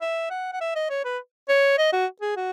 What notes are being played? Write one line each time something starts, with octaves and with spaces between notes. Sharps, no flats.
E5
F#5
F#5
E5
D#5
C#5
B4
C#5
D#5
F#4
G#4
F#4